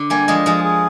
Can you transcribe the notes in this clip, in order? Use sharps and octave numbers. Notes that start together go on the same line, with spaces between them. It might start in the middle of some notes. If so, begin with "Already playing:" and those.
Already playing: D3
G3 A#3 G#5
F3 G#3 D#5
F3 G#3 G#4
G#4